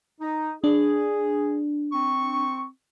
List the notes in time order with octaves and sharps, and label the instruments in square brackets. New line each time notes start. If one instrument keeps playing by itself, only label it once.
[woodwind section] D#4
[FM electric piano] D4 [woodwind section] G#4
[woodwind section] C4 C#6